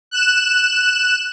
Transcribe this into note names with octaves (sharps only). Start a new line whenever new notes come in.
F#6 E7